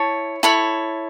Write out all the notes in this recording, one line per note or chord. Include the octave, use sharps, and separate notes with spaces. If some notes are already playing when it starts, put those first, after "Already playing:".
Already playing: E4 C#5 A5
E4 A4 C#5 B5